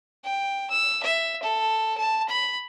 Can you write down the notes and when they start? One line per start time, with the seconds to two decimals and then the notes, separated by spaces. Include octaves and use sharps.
0.24 G5
0.71 E6
1.03 E5
1.42 A4
1.98 A5
2.29 B5